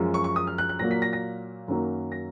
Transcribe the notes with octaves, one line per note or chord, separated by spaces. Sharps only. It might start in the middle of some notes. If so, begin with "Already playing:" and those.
Already playing: F#2 F3 G#3
C#6
C#6
D#6
F6
F#6
F#6
A#2 F#3 A#3 A#6
B6
A#6
A#6
F#2 D#3 F#3 A#3
A#6